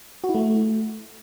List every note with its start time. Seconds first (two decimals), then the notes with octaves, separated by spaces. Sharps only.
0.24 F#4
0.29 E4
0.35 A3